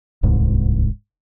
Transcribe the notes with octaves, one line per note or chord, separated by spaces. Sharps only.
D1 C2 G#2